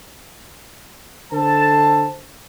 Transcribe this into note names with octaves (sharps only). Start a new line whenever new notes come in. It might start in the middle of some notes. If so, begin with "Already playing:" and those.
D3 A4 C5 A5